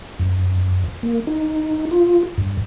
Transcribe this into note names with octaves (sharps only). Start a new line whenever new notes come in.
F#2
A#3
D#4
F4
G2